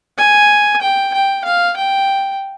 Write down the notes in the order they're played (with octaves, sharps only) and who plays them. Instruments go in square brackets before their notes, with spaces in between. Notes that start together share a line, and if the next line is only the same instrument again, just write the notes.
[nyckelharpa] G#5
G5
G5
F5
G5